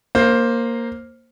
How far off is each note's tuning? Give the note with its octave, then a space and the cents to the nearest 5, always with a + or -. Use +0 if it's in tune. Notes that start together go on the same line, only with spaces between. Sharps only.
A#3 +0 C5 +15